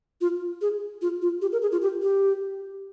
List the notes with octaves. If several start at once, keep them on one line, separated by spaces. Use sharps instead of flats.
F4
G#4
F4
F4
G4
A#4
G#4
F4
G4
G4